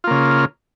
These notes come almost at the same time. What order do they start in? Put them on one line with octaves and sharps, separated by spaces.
F4 A#3 C#3